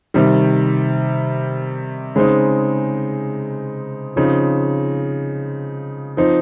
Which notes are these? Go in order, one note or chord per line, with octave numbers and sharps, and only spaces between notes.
C3 D#3 G3
C#3 G#3 C4 D#4
C#3 F3 C4 D#4
F3 C4 D#4